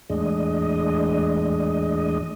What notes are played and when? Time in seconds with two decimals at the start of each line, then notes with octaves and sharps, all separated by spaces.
0.10 E2 A2 G#3 D4 D#5